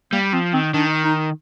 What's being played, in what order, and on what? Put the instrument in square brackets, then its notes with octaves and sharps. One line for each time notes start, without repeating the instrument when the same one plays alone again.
[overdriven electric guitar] G3 [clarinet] A#3
[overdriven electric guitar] F3 [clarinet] C4
[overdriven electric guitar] D#3 [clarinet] C4
[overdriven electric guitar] D#3 [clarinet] D4
[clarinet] D#4